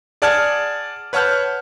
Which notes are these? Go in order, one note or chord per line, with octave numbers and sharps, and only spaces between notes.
G#4 D5 F#5 A5 F6 G#6
B4 C#5 F#5 A5 F6 G6